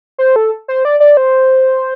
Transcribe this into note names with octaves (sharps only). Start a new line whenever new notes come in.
C5
A4
C5
D5
D5
C5